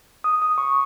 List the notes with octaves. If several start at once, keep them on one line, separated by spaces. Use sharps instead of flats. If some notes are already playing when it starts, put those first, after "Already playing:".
D#6
D#6
C#6